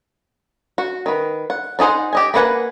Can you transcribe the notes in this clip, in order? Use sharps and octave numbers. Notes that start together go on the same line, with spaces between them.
F#4
D#3 B4
F#5
D4 D#4 G#4 C5 F#5
G4 D#5 G#5
A#3 A#4 B4 F#5 G#5